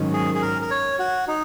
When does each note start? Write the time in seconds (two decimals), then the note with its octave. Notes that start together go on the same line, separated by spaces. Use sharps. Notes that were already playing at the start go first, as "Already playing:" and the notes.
Already playing: G#2 D#3 F#3 C#4
0.13 G#4
0.35 G#4
0.42 A#4
0.62 A#4
0.70 C#5
0.99 F#4
1.28 D#4